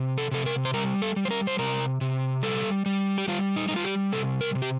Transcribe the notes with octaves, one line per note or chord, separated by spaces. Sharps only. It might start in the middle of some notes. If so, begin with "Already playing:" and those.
Already playing: C3
A4
C3 A4
A#4
C5
G3 A#4
A4
G3
C5
A#4
C5
C3 A#4
C3
G3 A4
G3
G4
G3 F4
D#4
G3 D#4
F4
G4
C3 A4
A#4
C3
G4